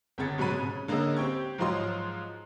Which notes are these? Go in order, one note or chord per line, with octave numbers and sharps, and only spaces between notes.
G1 C#3 G#4 G#6 A6 C#7
G#2 B2 F#3 C#5 B5 D#7
C#3
D3 A#3 C#4 G#4 D#5 E6
C4 G4 G5 C#6 G#6
G#2 F3 F#3 F4 D#5 C6